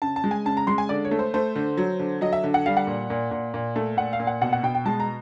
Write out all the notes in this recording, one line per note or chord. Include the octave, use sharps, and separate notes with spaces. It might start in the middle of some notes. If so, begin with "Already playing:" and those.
C#3 A5
A5
G#3
G#5
C#3 A5
A#5
G#3 C6
G#5
D3 D5
C#5
A3
C5
A3 C5
D3
F#3
D3
F#3 D#5
E5
D3
F#5
G3 F5
F#5
A#2
A#2
A#2
A#2
A3
A#2 F#5
F5
A#2
F#5
B2 F#5
F#5
B2 G5
G5
G#3 A5
A#5